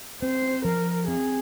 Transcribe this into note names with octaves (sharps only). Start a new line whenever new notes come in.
C4 C5
F3 A#4
C4 G#4